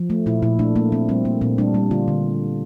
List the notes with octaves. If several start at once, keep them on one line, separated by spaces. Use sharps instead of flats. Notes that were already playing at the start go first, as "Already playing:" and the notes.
Already playing: F3
A3
A#2 E4
A#2 E4
A3 D4
A3 A#3
A#3 C4
G3 C4
G3 A#3
A#2 C4
G3 D4
G3
D3 F4
D3